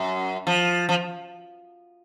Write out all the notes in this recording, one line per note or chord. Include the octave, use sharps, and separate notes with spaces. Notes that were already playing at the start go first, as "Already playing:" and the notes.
Already playing: F#2
F3
F3